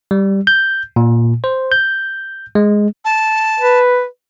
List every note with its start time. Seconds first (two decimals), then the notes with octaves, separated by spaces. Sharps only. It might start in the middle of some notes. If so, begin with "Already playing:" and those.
0.11 G3
0.47 G6
0.96 A#2
1.44 C5
1.72 G6
2.55 G#3
3.05 A5
3.60 B4